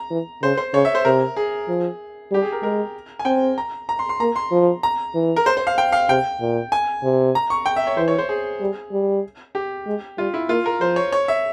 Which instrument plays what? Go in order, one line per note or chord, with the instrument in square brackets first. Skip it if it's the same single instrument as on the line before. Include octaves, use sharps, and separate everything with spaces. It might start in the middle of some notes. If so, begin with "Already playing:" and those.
Already playing: [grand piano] A#5
[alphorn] E3
[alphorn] C#3 [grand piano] C5
[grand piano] C5
[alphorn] C#3 [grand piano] C#5
[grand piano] E5
C5
[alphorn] C3 [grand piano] A#4
[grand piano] G#4
[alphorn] F3
[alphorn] G3 [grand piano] G4
[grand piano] G#4
A#4
[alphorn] G#3 [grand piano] A#4
[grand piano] G#5
[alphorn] C4 [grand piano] G5
[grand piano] A#5
A#5
C6
C6
[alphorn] A#3 [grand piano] A#5
[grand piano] C6
[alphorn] F3
[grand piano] A#5
[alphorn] E3
[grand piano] A#4
C5
C5
F5
G5
F5
[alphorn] C3 [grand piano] G5
[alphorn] A#2
[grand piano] G#5
[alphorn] C3
[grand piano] A#5
C#6
G5
E5
C#5
[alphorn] E3 [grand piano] C5
[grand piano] C#5
C5
G#4
[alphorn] G3
G3
[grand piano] G4
[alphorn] G#3
[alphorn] G3 [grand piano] F4
[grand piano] E4
[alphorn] A#3 [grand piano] F4
[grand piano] A#4
[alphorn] F3 [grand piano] C5
[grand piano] C#5
C#5
E5